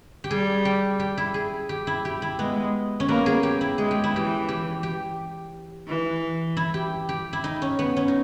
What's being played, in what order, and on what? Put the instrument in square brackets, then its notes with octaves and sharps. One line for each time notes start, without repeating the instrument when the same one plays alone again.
[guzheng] G4
[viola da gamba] G3 [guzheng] G#4
[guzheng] G4
G4
E4
G#4
G4
E4
G4
E4
[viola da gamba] G#3 [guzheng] B3
[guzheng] C#4
[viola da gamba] A#3 [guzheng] B3
[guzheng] G#4
G4
E4
[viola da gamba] G#3 [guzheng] G#4
[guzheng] G4
E4
[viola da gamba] E3 [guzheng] G4
[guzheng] G4
G4
[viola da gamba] E3
[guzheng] E4
G4
G4
E4
D#4
C#4
B3
C#4
D#4